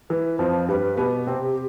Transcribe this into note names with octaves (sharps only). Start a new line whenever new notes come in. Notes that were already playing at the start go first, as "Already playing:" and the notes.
E3 B4
F2 F3 C5
G2 G3 B4
B2 B3 G4
C3 C4